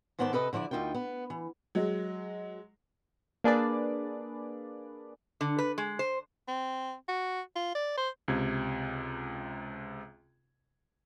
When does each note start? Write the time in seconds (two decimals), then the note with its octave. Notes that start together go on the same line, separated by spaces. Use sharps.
0.19 G#2 D#3 B3 C5 D5 A5
0.33 C3 A4 B4 D#5
0.53 D3 F3 E4 C#5 D5
0.71 D2 D#4 F4 A#4 G5
0.95 B3
1.30 E3
1.75 F#3 G#3
3.44 A#3 D4 G#4 B4 D5
5.41 D3
5.59 B4
5.78 G#3
5.99 C5
6.48 C4
7.08 F#4
7.55 F4
7.75 D5
7.97 C5
8.28 C#2 C3 G#6